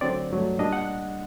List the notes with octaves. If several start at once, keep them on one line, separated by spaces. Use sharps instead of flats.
D2 D3 F#3 C4 D5
G2 F#3 A3
A#2 G3 D4 D#5
F#5